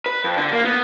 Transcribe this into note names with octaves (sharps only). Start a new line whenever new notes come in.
B4
F2
D3
A#3
B3